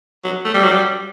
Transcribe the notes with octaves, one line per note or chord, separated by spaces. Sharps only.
F#3
A3
G3
F#3
G3